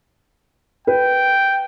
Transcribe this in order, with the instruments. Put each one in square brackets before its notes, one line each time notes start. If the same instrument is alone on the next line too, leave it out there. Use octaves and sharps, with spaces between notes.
[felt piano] B4 [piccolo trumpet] G5